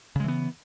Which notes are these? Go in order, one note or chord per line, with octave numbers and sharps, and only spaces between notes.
C#3 E3 G#3 B3